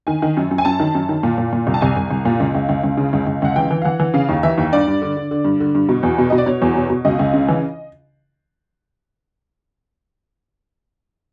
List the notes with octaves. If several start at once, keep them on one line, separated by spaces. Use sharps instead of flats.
D#3 G#5
D#3
F#2
F#2
G#5
F#2 A5
D#3
F#2
D#3
A#2
A#2
A#2
C2
A5
C2 G#5
C2
C2
A#2
C#2
C#2
C#2
C#2
C#3
C#2
C#2
C#2 F#5
E3 G5
E3
F5
E3 F#5
E3
C#3 F5
D#2
E3 E5
D#2
G2 D5
G2
D3
D3
D3
G2
D3
G2
B2
E2
B2
B2 D#5
D5
B2 C#5
E2
B2
B2
C#2 D#5
C#2
C#3
E3